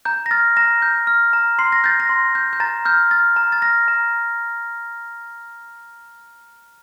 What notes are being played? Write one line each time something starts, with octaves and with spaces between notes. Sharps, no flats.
A#5 G6
A#6
F6 A6
A#5 A#6
G6
F6
A#5
C6 C7
A#6
G6 A6
A#6
C6
G6
G6
A#5 A6
F6 G6
F6 A6
A#5
A6
F6 A#6
A#5